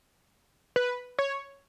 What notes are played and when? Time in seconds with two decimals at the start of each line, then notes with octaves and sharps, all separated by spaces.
0.76 B4
1.19 C#5